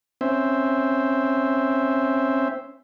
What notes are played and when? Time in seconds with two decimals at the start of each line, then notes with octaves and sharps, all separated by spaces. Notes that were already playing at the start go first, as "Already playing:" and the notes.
0.21 C4 C#4 C5 E5